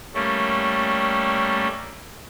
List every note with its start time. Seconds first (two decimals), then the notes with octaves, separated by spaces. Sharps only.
0.14 G3 A3 A#3 C#4